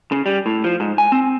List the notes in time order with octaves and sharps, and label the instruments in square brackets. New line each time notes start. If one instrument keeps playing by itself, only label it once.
[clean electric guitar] C#3
G3
A2
F3
G#2
G#5
C4